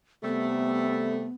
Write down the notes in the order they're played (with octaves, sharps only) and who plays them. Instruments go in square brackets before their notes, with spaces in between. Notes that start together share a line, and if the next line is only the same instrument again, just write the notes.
[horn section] C3 G3 A3 [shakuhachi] B3